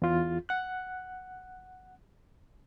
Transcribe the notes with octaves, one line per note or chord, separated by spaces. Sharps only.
E2 F4
F#5 F#6